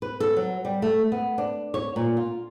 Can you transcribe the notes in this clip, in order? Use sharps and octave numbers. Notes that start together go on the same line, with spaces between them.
B4
A4
F#3
G3
A3
B3
D4
C#5
A#2
F4